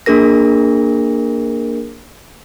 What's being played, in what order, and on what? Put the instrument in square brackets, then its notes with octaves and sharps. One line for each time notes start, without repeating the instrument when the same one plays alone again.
[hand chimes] A#3 D4 G#4 A#4 A#6